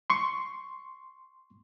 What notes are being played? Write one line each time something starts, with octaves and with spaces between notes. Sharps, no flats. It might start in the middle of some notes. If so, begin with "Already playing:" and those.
C6 C#6